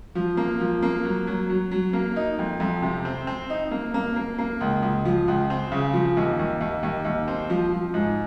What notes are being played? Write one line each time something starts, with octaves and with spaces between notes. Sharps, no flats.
F3
A#3
F3
A#3
F#3
F#3
F#3
F#3
A#3
D#4
F2
F2
C3
C4
C4
D#4
A#3
A#3
A#3
A#3
C#2
C#2
F3
C#2
C4
C#3
F3
D#2
D#2
D#2
D#2
D#2
C4
F3
F3
G#2